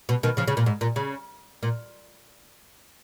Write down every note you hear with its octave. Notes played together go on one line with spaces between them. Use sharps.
B2
B2 D#3
C#3 F3
C#3
A#2
G#2
A#2
C#3
A#2